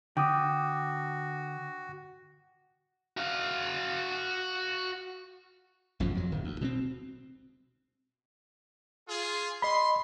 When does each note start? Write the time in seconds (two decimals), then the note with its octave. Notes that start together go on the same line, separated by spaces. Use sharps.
0.17 D3 F#4 G5 D6 D#6
3.17 F#4 F5
6.00 G#1 F#2 B2 F3
6.15 F2 F#3
6.31 D1 D#3
6.44 D2
6.61 B2 G#3 C4
9.09 F4 G#4
9.62 D#5 B5 C6